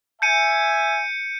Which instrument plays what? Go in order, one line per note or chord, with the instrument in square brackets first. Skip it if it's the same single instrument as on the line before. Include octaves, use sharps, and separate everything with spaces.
[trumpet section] E5 G#5 [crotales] G6 C#7 D#7